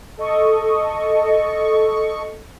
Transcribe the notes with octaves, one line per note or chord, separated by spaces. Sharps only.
A4 D#5 C#6